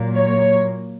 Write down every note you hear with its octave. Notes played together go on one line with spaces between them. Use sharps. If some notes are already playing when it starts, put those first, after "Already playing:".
Already playing: A#2 F#3 A#3
C#5